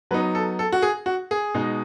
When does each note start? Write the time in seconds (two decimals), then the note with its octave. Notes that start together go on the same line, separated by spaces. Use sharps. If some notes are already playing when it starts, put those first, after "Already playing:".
0.11 F#3 B3 D#4 B4
0.35 A4
0.59 A4
0.72 F#4
0.82 G#4
1.06 F#4
1.31 G#4
1.54 B2 G#3 D#4